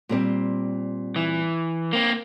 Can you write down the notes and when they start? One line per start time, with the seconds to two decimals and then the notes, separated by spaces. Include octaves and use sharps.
0.09 A#2 G3 C4
1.16 E3
1.93 A#3 C4